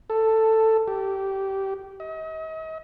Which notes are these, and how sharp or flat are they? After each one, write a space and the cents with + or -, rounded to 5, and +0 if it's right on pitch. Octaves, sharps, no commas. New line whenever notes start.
A4 +10
G4 -15
D#5 +40